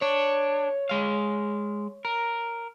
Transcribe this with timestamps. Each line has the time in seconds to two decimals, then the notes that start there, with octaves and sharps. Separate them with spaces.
0.02 D4 C#5
0.89 G#3 F5
2.05 A#4